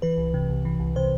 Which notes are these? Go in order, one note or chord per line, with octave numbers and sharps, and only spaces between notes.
E3 B4
C2
C3
C2
E3
C2
C3 C5